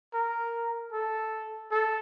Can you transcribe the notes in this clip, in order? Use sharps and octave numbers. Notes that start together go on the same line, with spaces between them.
A#4
A4
A4